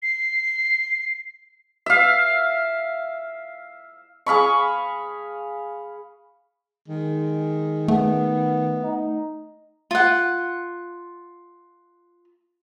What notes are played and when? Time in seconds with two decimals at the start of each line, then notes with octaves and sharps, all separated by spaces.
0.03 C7
1.86 E5 F5
4.26 G#4 F5 B5 C#6
6.88 D#3 G#3
7.88 A3 B3
8.83 D#4
9.91 F4 F#5